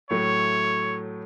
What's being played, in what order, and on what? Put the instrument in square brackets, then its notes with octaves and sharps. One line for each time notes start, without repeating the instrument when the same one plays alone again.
[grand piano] A2 F#3 A3 [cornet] C#5